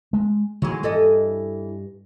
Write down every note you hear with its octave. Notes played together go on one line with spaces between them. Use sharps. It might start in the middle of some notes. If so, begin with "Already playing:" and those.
G#3
D#3 E3 F#3 G#3 A#3
G2 E3 A4 D#5